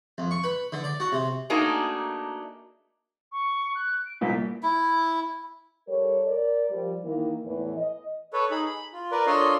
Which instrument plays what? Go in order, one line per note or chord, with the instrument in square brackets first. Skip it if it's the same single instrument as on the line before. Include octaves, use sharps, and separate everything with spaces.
[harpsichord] F2
C#6
B4
D3
D5
F#4
C3
[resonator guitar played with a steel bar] A3 A#3 D4 D#4 F#4 G#4
[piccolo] C#6
F#6
D7
[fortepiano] C2 A#2 [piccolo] B6
[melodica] E4
[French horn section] G3 A4 A#4 C#5
A#4 D5
F3 G3
D#3 E3 A#3
E2 A2 E3
D#5
[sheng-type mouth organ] A4 B4 C#5
D#4 G#4 B5
B5
F4
A#4 B4 D5
D4 F4 A4 C#5 D#5 C6